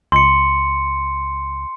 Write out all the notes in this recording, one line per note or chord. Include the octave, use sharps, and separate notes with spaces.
C#2 C6 C#7